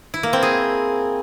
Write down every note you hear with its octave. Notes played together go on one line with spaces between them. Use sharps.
E4
A#3
C4
G#4